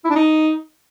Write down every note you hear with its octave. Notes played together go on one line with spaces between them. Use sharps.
E4
D4
D#4